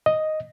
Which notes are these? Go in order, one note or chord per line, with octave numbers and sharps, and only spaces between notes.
D#5